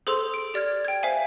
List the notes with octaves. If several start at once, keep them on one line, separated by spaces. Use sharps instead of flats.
G#4 A4 C5 C6 E6 F7
D7
G4 D5 F6 G#6
G5 G#6
C5 E5 F5 G#5